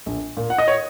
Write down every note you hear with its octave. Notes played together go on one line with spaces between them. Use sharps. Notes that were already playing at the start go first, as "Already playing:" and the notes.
A#1
A#2
F#5
D#5
C#5